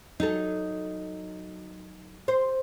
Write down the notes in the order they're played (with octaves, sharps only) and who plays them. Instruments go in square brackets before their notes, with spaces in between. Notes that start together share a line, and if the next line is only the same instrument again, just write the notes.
[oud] F#3 A4 [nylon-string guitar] D#4
[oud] C5